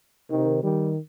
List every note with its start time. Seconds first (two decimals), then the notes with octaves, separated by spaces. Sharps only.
0.30 C3 D#3
0.63 D#3 G3